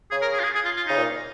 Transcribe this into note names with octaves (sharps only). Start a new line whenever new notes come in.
C#3 G#4
A#4
G#4
F4
G#4
G#4
F4
F4
C#3 D#4
A#2